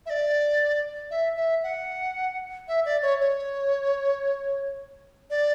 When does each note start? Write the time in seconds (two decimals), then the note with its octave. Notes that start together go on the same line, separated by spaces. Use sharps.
0.06 E5
0.10 D5
1.11 E5
1.37 E5
1.64 F#5
2.68 E5
2.85 D5
3.02 C#5
3.20 C#5
5.30 D5